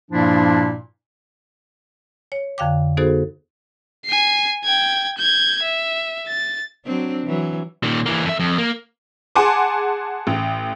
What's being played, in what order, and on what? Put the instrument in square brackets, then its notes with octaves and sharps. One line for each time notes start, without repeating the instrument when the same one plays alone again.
[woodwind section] G2 A#2 F3 A#3 D4 E4
[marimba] C#5
F2 D3 F5 G5 D6
B3 D#4 F#4 G#4 A4 C5
[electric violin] G#5 C7
G5 G#6
G6 G#6
E5
A6
[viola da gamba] F#3 C4 D4
E3 F#3
[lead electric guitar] A#2 D#3
E3 A#3
F2 E5
F2
A#3
[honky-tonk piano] G#4 F#5 G#5 A5 C6 D6
A1